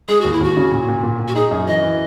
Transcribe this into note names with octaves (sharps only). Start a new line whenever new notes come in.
G#3 G#4
D#2 F#4
E4
D#2 F#4
C#3
A#2
A#2
A#2
A#2
F#4
D#4 G#4
F#2
E3 D#5
E3